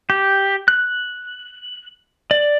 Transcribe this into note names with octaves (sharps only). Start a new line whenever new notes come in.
G4
F#6
D5